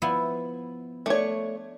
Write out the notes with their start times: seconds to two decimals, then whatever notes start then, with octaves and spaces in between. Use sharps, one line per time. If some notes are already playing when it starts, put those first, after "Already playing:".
0.02 F3 B3 E4
1.06 A3 D4 C#5